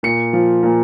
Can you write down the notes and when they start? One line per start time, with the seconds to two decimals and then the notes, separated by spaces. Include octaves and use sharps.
0.03 A#2 C#7
0.33 F3
0.63 A#2